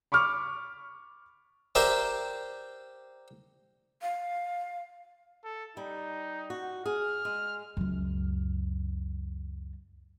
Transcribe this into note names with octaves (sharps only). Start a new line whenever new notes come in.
B5 C#6 D6 F6
G4 A#4 C5 D5 E5 G5
F5
A4
G3 D#4
F#4
G#4 F6
G#3
C#2 F#2